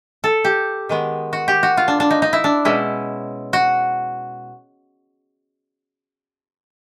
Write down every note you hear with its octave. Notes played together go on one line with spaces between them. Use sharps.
A4
G4
D#3 G#3 B3
F#4
G4
F#4
F4
D4
D4
D#4
D#4
E4
D4
B2 G#3 C#4 E4
F#4